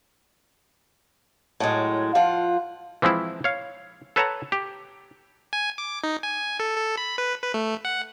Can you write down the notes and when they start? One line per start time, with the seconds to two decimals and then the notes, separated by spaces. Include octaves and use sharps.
1.60 A2 F#3 G#3
2.15 F3 F4 F#5
3.02 E3 F3 G#3 C4 E4
3.44 C#5 F5
4.16 A4 B4 C#5 F#5 A5 A#5
4.52 G4
5.53 G#5
5.78 D6
6.03 D#4
6.23 G#5
6.60 A4
6.76 A4
6.97 B5
7.18 B4
7.43 B4
7.54 A3
7.85 F#5